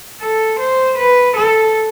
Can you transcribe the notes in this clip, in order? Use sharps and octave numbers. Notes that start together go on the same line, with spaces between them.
A4
C5
B4
A4